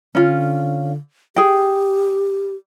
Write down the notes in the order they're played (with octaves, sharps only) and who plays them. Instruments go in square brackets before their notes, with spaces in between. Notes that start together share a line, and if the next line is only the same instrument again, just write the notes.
[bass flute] D3 [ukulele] C#4 F4
[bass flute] G4 [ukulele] G#4 G5